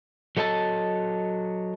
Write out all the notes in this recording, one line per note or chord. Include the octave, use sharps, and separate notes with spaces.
F#3 A4 D#5 G#5 A5